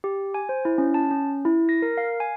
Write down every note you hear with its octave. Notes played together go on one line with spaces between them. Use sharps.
G4
G#5
C5
E4
C#4
A5
C#4
E4
A#6
A#4
F5
G#5